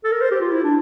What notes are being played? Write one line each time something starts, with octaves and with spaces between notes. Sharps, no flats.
A4
A#4
C5
G4
F4
E4
D4